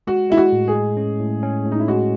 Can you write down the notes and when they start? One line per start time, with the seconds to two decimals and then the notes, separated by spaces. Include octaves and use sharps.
0.07 G#3 F#4
0.30 G#3 E4
0.37 F#4
0.52 A2
0.68 G#4
0.75 G#3
0.97 C#4
1.20 A2
1.43 C#4
1.65 A2
1.72 D#4
1.80 E4
1.88 G#3 F#4